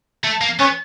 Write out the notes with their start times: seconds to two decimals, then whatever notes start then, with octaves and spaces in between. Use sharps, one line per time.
0.24 A3
0.41 A#3
0.60 B3 C#4